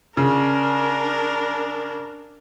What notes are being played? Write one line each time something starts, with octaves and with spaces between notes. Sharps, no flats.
C#3 D4 A#4